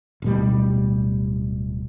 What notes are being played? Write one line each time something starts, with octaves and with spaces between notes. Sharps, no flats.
D1 B2 G3